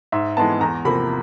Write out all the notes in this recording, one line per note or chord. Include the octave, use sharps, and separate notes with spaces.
G#2 E5
E3 G#3 B3 A5
E2 A#5
C3 F3 A#3 B5